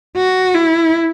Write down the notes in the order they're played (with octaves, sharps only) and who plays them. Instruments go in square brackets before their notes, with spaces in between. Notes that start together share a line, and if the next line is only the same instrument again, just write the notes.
[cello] F#4
E4